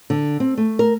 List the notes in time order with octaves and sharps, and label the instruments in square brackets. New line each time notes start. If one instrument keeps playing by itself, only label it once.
[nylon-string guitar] D3
C4
A3
A#4